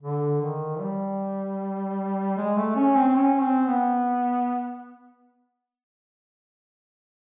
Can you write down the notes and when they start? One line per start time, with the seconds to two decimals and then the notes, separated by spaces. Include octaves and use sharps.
0.02 D3
0.41 D#3
0.80 G3
2.37 G#3
2.57 A3
2.76 C#4
2.96 C4
3.08 C4
3.15 C#4
3.41 C4
3.67 B3